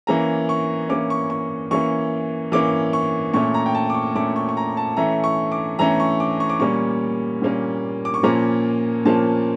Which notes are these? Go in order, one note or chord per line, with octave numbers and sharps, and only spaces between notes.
E3 A#3 C#4 A#5
C#6
E3 A#3 C#4 D6
C#6
C#6
E3 A#3 C#4 C#6
E3 A#3 C#4 D6
C#6
A#2 A3 C#4 C#6
A#5
G5
A5
D6
C#6
A#2 A3 C#4 D6
C#6
C#6
A#5
A5
E3 A3 C#4 A#5
C#6
D6
E3 A3 C#4 A#5
C#6
D6
C#6
D6
A#2 G3 A#3 C#4 C#6
A#2 G3 A#3 C#4
D6
C#6
A#2 F3 A#3 C#4 A#5
A#2 F3 A#3 C#4 A5